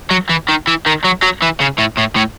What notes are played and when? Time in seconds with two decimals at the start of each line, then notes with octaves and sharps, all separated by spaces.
0.11 F#3
0.30 E3
0.49 D#3
0.68 E3
0.86 D#3
1.05 F#3
1.23 F#3
1.42 E3
1.61 C#3
1.79 A2
1.98 A2
2.16 A2